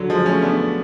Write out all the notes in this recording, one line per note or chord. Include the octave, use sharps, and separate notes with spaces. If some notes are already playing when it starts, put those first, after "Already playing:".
Already playing: D3 F#3
F3 G#3
A3 C#4
B3 D4